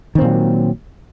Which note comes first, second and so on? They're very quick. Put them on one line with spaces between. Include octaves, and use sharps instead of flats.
D#3 C4 A#2 F#3